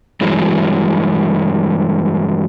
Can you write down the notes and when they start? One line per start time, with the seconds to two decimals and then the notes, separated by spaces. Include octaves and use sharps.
0.21 G2 E3 F#3 G#3